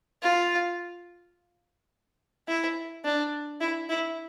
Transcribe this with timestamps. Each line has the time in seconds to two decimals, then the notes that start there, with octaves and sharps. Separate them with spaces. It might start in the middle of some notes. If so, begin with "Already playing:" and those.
0.23 F4
2.48 E4
3.05 D4
3.61 E4
3.89 E4